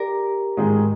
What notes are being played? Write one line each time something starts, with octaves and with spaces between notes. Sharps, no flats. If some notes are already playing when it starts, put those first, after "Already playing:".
Already playing: G4 A#4 D5
G#2 D#3 G#3 D#4 G#4